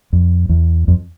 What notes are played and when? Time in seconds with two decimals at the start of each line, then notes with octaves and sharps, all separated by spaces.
0.13 F2
0.49 E2
0.88 F2